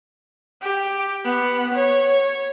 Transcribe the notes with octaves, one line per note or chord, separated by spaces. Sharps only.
G4
B3
C#5